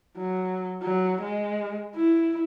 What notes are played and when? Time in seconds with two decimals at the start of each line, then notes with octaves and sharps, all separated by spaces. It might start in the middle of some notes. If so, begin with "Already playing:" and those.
0.17 F#3
0.82 F#3
1.22 G#3
1.96 E4